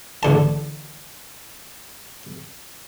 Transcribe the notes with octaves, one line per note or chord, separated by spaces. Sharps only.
A1 D3 A5